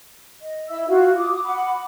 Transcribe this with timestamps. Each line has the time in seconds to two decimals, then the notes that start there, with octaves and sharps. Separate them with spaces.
0.41 D#5
0.69 E4 E5 E6
0.88 F4 F#4 F5
1.16 D6 D#6
1.44 F#5 B5 D6